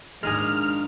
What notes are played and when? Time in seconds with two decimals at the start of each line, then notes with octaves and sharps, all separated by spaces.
0.23 A#1 D#2 G#2 G#3 D4 D#4 G#4 F6